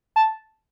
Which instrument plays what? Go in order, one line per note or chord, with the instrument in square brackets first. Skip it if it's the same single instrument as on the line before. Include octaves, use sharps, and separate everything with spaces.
[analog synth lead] A5